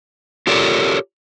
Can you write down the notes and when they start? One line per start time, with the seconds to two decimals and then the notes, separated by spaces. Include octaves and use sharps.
0.47 F4 G4 A4 A#4 C#5 D5